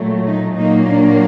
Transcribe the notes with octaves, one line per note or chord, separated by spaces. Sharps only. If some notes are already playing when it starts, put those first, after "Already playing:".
Already playing: A#2 F#3 A3
D#4
A#2 F#3 A#3 D#4
D4